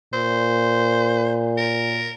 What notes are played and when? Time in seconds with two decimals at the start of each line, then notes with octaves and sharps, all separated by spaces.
0.13 A#2 C5
1.57 A#4